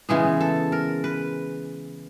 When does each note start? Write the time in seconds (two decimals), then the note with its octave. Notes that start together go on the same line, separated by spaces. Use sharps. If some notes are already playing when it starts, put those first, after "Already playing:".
0.09 C#3 E3 G#3 B3 G#4
0.40 A4
0.72 A#4
1.04 B4